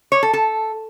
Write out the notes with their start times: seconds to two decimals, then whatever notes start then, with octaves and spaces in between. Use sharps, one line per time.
0.12 C#5
0.23 A4
0.33 A4